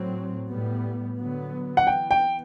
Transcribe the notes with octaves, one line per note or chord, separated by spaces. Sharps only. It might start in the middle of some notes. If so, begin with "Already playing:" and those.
Already playing: A2 F#3 C4
A2 G3 B3
D3 F#3 B3
F#5
E3 B3 G5
G5